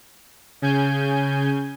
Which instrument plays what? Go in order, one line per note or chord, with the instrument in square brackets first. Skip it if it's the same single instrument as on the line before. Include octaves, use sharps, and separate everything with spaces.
[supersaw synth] C#3 G#5 G6